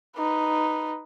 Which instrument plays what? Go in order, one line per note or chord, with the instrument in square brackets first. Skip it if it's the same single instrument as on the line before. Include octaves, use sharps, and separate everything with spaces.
[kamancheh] D#4 B4